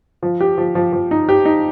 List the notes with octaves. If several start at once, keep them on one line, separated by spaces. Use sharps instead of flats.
F3
G4
F3
F3
F3
D#4
G4
D#4